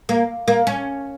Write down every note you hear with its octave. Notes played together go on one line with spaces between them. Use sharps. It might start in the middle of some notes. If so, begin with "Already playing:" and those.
A#3
A#3
C#4